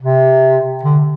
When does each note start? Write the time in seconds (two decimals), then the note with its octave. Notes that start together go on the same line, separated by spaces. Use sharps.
0.02 C3
0.83 D3